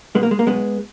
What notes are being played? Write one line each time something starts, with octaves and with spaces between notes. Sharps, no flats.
B1 B2 G#3 B3
A#3
G#3
A#3
B1 B2 G#3 B3